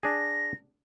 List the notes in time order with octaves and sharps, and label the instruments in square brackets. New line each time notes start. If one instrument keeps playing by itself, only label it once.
[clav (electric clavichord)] D4 G#4 [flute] A#6